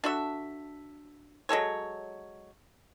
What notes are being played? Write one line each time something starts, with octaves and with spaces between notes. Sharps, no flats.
D4 F#4 A4 E5
F#3 G#3 A4 C#5